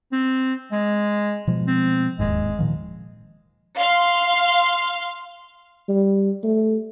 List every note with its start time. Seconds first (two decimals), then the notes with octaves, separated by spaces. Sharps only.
0.12 C4
0.72 G#3
1.47 B2 F3 G#3
1.67 C4
2.19 D1 D#2 G#2 G#3
2.59 A#2 D#3 F3
3.78 F5 C6
5.89 G3
6.43 A3